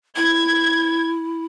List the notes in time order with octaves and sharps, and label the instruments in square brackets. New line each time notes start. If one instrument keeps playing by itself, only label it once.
[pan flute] E4 [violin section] G#6